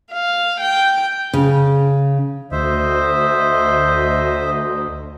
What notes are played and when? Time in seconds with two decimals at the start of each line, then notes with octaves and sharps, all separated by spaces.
0.12 F5
0.60 G5
1.33 C#3
2.52 D2 C5 D#5 E5